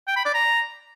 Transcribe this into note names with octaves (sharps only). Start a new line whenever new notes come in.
G5
B5
D5
A#5